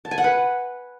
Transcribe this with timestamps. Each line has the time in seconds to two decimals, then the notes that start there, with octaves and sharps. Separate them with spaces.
0.05 A5
0.11 G#5
0.18 F#5
0.24 B4